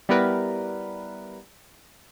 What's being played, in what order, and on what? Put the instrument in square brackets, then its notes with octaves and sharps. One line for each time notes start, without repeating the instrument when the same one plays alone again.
[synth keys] G3 B3 E4 A#4 B4